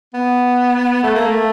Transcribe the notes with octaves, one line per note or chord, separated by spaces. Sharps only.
B3
A3
A#3
A3